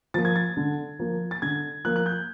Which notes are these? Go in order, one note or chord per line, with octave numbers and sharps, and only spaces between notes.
F3 A#3 A6
G#6
A6
D3
F3 A#3
A6
D3 G#6
F3 A#3 F#6
F#6
G6